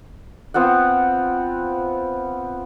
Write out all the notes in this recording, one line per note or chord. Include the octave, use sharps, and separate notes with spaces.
B3 C4 F4 F#5